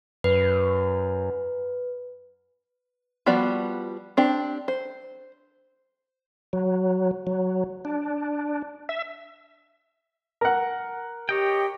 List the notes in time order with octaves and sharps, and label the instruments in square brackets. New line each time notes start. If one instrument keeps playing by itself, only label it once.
[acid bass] F#2 [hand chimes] B4
[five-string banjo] F3 G3 B3 F#4 D5
C4 D4 G4
C5
[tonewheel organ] F#3
F#3
D4
E5
[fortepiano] A#4 F#5
[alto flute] G4 [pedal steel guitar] C#5 D#5 G5